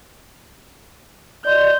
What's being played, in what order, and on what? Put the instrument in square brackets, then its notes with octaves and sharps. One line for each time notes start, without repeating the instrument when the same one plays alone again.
[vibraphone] D5 D#5 C6 [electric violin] G6